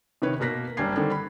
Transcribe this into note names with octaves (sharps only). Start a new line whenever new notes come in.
C3 D#3 B4 C#5
B2 A#3 F#6 A#6 B6
F#1 G3 C#4 D4 G#6 C7
D3 D#3 G3 C4 D4 A4
B5